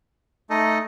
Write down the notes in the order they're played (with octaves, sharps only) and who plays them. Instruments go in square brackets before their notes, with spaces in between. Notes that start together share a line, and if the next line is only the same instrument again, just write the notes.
[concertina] A3 D#4 A4 D#5